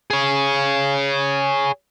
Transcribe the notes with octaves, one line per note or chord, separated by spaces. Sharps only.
G#4 C#5